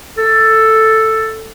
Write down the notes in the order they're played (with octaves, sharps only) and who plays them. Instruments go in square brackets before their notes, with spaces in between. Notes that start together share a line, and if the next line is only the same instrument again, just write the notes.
[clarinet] A4